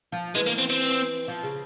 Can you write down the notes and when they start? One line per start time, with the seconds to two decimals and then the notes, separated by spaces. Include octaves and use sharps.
0.12 F3
0.35 E3 G#3
0.47 A#3
0.58 C4
0.70 C4
1.28 F3
1.43 C#3